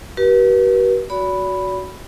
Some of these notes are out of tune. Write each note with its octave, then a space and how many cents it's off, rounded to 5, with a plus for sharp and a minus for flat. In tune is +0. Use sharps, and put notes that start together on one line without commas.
G4 -45 B4 -40
F#4 +0 D5 -45 B5 +0